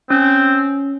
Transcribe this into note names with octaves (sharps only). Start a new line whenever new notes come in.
C4 C#4